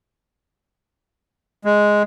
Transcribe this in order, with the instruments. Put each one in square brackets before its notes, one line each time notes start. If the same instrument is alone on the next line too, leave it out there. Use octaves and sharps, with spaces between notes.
[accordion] G#3